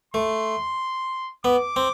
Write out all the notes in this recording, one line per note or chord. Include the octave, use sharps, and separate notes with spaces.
A3 C6
B3 D6
C4